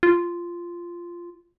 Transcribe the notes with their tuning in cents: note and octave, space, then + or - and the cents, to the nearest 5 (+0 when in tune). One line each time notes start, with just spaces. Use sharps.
F4 -10